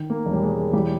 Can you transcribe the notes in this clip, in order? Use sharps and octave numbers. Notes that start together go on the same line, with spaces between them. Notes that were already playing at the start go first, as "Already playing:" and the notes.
Already playing: D#3
A#3
E1
G3
G#3
E3 G3